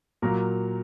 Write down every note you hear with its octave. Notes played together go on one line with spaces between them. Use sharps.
A#2 F#3 A#3 A#4 A#5